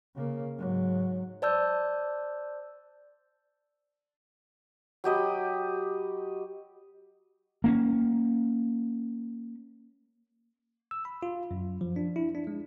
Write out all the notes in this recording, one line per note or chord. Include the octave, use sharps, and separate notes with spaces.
C#3 A#3
G#2 F#3
C5 D5 A5 E6 G6
F#3 G4 D#5 B5
A#3 B3 C#4
E6
B5
F4
F#2
F3
D4
E4
D4
G#3